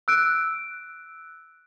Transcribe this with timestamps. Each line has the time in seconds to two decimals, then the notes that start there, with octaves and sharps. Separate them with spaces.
0.08 E6 F#6 D7